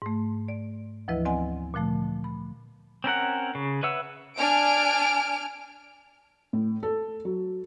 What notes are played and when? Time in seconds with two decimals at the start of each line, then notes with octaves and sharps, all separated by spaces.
0.02 G#2 A3
0.48 D5
1.08 D2 E3 F3 E4 B4 D#5
1.25 B3 C4 D5 D#5 F#5 G#5
1.74 A#2 D3 F3 A3
2.24 B5
3.04 C4 C#4 A#4 F#5
3.55 C#3
3.83 B4 C#5 E5 F#5 E6
4.37 D4 G#5 F6 D7
6.53 A2
6.83 A4
7.25 F#3